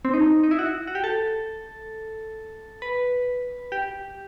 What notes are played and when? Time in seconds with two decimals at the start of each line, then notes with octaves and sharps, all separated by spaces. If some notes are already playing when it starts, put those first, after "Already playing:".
0.05 C4
0.14 D#4
0.44 D#4
0.51 E4
0.59 F#4
0.87 F#4
0.95 G4
1.04 A4
2.82 B4
3.72 G4